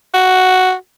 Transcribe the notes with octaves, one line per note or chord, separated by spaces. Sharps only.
F#4